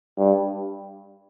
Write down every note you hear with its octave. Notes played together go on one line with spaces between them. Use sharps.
G2